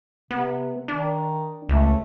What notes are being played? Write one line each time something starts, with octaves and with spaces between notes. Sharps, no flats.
C3 B3
D#3 D4
C#2 A3